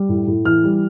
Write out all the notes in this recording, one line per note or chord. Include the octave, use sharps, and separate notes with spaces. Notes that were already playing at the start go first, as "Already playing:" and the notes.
Already playing: G3
A2
A2
E3 F6
G3